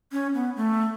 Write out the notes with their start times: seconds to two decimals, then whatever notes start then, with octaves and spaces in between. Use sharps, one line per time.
0.12 C#4
0.34 B3
0.56 A3